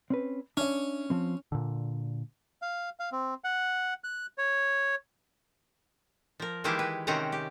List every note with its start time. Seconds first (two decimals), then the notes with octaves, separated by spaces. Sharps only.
0.10 C4 C#4 B4
0.57 C#4 D4 E5
1.10 F3 C4
1.52 A#2 D3
2.62 F5
3.00 F5
3.12 C4
3.44 F#5
4.04 F#6
4.38 C#5
6.40 F3 A#4
6.64 D#3 E3 G#3 A#3 E4 G4
6.79 B4
7.07 C3 D#3 C4 C#4 F#5 A#5
7.32 G4